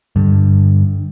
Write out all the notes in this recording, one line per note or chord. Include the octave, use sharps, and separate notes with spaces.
G2 D3